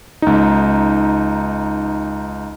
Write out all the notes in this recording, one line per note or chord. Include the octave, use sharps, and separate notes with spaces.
C#2 D#4